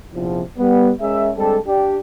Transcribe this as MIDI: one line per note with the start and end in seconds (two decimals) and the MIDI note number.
0.14 0.42 34
0.14 0.42 40
0.14 0.42 48
0.14 0.42 53
0.59 0.91 55
0.59 0.91 59
1.01 1.30 56
1.01 1.30 61
1.01 1.30 68
1.01 1.30 70
1.01 1.30 76
1.37 1.58 55
1.37 1.58 56
1.37 1.58 60
1.37 1.58 62
1.37 1.58 67
1.37 1.58 69
1.67 1.97 62
1.67 1.97 67